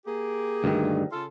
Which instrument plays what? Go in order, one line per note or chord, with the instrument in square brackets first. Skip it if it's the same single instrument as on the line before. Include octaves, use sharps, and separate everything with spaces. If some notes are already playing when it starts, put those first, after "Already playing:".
[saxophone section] A#3 G4 G#4
[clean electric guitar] D2 G2 D#3
[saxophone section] C#3 F4 A4